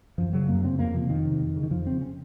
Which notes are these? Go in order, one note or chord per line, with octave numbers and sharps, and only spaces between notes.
F#2 F3
C#3 F#3
F#2 A#3
C#3 C4
F2 A#3
C3 F3
F2 D#3
C3
F2
C#3
D#3
F2 F3
C#3 C4
C#4